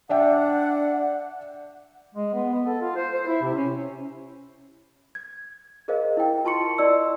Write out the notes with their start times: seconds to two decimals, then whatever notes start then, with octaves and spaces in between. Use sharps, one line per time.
0.10 D4 D5 E5 F#5 G5
2.15 G#3
2.33 B3
2.53 B3
2.66 A4
2.81 F4
2.96 C5
3.14 C5
3.27 E4
3.42 C3
3.55 C#4
5.15 G#6
5.88 G#4 A#4 C5 D#5 F5
6.17 E4 A#4 G5
6.45 F4 A5 C6 C#6 C#7
6.78 E4 D5 D#5 C6 E6